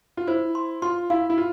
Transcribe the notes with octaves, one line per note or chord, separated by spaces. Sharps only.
F4
E4 C5
C6
F4 C6
E4 F5
E4
F4